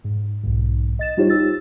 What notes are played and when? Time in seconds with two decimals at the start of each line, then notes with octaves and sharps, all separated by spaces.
0.04 G#2
0.43 B1 G#2
0.99 D#5 A6 E7
1.17 G3 D#4 F4 G4 C5 C#5
1.30 E6 A6